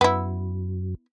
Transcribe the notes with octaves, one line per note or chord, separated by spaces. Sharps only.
F#2 B3 E4